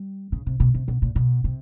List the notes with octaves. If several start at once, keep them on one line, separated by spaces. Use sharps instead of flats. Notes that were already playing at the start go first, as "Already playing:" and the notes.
Already playing: G3
C#3
C3
B2
C3
B2
A#2
B2
C3